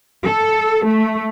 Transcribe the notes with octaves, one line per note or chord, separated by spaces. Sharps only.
A4
A3